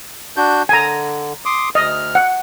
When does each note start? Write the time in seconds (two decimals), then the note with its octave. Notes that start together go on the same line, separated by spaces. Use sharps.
0.37 D4 F#4 G6
0.69 D3 G#5 A#5
1.45 C6 D6 D#6
1.75 D2 D#5 F6
2.15 F#5